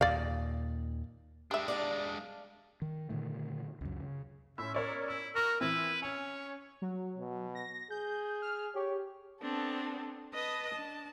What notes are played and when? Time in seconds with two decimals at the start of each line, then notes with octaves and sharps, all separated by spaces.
0.01 D#2 A#2 D5 F5
1.51 G#3 D4 G4 E5
1.68 D5 F5 A5
2.82 D#3
3.10 A#2 D3 D#3 A3
3.81 C#2 F#2
4.00 C#3
4.58 A2 C#4 E5 C6 E6
4.74 E4 A#4 C#5 D5
5.08 E4 E6
5.35 F#4 A#4 C#6
5.61 E3 C4 E4 B4
6.02 C#4 C#5 G#5
6.82 F#3
7.17 B2
7.55 A#6
7.91 G#4 G6
8.42 F6
8.75 G4 C#5
9.41 B3 C4 D4 A4
10.33 B4 D#5 A5 D#6
10.71 D4 A5